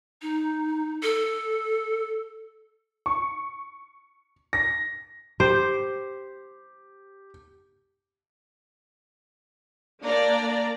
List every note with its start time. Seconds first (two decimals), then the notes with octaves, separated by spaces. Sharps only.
0.22 D#4
1.03 A4
3.06 C#6
4.53 A#6
5.40 G4 C5
10.03 A#3 D4 D5 A#5